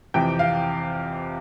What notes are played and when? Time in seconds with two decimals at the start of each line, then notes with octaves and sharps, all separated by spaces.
0.14 F2 C3 E3 G5
0.39 F5